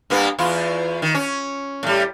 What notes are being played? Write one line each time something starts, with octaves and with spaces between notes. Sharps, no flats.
G2 A#3 B3
E2 E4 F4
D#3
C#4
A2 G3